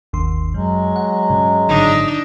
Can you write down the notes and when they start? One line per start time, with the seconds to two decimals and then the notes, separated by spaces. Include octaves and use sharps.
0.13 G1 D#2 C6
0.54 F#2 F#3 G#3
0.96 F#5
1.30 G2 C#3
1.69 G#1 D3 D4 D#4